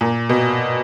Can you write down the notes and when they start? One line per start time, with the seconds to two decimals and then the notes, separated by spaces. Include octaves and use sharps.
0.01 A#2
0.29 B2